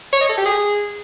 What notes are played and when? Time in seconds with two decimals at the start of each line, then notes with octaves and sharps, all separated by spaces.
0.13 C#5
0.21 D#5
0.29 A4
0.37 G4
0.46 G#4